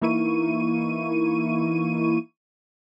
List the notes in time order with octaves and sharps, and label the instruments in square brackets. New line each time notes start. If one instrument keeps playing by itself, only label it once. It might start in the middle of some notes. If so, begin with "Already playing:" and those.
[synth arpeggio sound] E3 A#3 D#4 E4 C#6 D#7